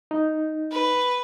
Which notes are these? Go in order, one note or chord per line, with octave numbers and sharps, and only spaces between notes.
D#4
B4